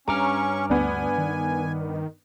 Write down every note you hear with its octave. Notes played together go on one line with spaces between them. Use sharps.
G2 C#4 A#5 C#6 D6 F6
D2 B3 D4 G#5
D#3